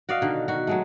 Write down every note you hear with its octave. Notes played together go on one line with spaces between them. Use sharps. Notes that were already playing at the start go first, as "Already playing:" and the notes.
F#4 D5 D#5 F5
B2 D3 D#3
D#3 F#4
F#3 G#3 A3